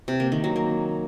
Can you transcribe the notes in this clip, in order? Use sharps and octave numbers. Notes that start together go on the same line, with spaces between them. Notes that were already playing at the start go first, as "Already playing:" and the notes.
C3
A#3
D#3
F#3
A#3